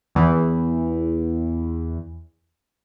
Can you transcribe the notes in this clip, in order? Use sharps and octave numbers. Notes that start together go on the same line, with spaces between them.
E2 E3